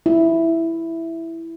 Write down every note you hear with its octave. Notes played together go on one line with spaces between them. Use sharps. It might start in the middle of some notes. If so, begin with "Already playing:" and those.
E4